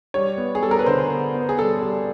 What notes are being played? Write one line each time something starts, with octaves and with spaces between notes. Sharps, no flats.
G3 C#5
B3
G#4
G3 A4
A#4
B4
D3 C5
B3
B3
G#4
G3 A4
G3